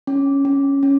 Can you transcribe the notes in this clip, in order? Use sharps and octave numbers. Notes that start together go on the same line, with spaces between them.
C#4
C#4
C#4